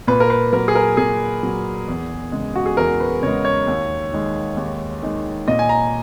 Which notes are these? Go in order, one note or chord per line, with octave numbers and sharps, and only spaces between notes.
A#2 B4
A#4
B4
F#3 A#4
G#4
A#4
A#2 G#4
F#3
E2
C#3 G#3
F#4
G#4
E2 A#4
B4
C#3 G#3 C#5
C#5
D#2
D#3 G#3
D#2
D#3 G#3
A#2 D#5
G#5
A#5